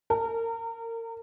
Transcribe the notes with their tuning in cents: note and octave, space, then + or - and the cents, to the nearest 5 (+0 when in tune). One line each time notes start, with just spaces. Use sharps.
A#4 -30